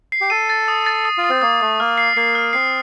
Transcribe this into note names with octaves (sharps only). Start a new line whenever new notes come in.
C7
G4
A4 D#7
A6
D#6
A6
D#6
F4
D#6
C4
A#3 D#6
A3 D#6
A#3 F6
C7
A#3 C7
F6
C4 C7